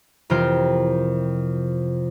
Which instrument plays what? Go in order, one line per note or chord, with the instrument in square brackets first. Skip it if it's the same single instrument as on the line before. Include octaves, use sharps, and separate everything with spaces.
[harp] F2 C3 E3 F4 A#4 G5